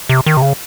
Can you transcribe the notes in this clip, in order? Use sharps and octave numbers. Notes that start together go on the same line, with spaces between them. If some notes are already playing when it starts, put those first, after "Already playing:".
C3
D#3
C3
C#3